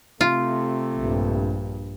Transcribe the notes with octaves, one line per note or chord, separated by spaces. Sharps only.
C3 A3 F4
A#1 G2